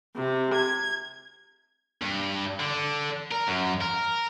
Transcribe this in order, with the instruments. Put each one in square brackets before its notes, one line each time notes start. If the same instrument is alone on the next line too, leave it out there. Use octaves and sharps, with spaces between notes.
[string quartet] C3
G#6
[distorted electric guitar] G2
D3
A#4
F#2
A#4